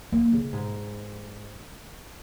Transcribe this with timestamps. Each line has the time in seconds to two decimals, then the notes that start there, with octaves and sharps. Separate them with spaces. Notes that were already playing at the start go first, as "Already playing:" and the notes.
0.12 A#3
0.32 C#3
0.53 G#2